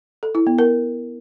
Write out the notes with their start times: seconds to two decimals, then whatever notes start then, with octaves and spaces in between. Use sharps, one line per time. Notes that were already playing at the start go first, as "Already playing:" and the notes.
0.23 A4
0.35 E4
0.47 B3
0.59 A#4